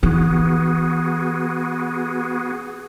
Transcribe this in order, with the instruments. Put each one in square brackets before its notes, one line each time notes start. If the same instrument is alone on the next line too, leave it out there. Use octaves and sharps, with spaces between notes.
[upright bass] E3 D#4 [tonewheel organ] B3 F#4 G#4